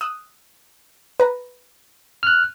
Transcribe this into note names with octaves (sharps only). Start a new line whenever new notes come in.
D#6 E6 F#6
B4 A#5
F6 F#6